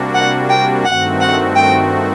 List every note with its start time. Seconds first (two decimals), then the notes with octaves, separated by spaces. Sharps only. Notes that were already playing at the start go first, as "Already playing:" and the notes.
Already playing: C3 G3 A#3 D4 F#4
0.14 F#5
0.50 G5
0.85 G2 D#3 A3 C4 F#4 F#5
1.20 F#5
1.56 G5